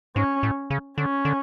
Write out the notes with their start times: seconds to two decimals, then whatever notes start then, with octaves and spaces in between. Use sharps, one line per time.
0.16 G#2 C#4
0.43 A2
0.70 C#3
0.98 D3 C#4
1.25 D3